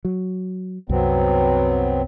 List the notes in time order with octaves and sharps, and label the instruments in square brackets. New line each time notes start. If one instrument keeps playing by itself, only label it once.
[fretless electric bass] F#3
[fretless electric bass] C2 F#2 [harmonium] F#3 B3 C4